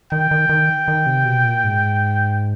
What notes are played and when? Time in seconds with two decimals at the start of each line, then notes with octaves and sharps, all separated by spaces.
0.12 D#3 G5
0.31 D#3
0.49 D#3
0.88 D#3
1.06 C3
1.25 B2
1.45 A#2
1.64 G#2